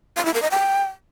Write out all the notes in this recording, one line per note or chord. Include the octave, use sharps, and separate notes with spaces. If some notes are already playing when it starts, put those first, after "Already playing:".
F5
E4
A#4
D#5
G5